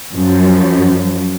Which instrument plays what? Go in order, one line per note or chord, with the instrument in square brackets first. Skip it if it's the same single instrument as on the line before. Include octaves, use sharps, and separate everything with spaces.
[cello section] F#2 F3